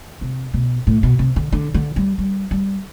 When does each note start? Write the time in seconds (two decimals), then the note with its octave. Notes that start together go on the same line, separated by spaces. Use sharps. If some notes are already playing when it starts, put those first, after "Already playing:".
0.21 C3
0.54 B2
0.87 A2
1.03 B2
1.19 C3
1.36 D3
1.52 D3
1.74 D3
1.96 G3
2.18 G3
2.51 G3